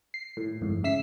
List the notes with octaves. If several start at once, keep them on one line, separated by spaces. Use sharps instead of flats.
C7
A2
G1 F2 G#2
C#3 E5 E6 B6 C7